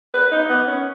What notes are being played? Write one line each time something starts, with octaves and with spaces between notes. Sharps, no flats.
B4
D#4
B3
C#4